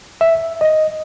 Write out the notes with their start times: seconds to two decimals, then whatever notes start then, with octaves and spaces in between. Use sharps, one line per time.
0.21 E5
0.61 D#5